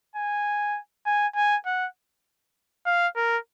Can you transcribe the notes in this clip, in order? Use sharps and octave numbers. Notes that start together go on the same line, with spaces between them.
G#5
G#5
G#5
F#5
F5
A#4